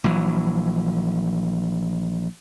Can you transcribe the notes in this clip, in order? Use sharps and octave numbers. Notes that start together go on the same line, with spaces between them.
A#1 E3 F#3